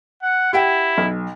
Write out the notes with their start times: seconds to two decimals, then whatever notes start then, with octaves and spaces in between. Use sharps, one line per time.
0.22 F#5
0.53 E4 G4 F#5 G5
0.98 B1